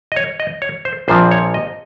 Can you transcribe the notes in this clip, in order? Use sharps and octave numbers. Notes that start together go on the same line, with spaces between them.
D#5
C#5
D#5
C#5
C5
A#1 A#2 F3 C4 C5
C#5
D#5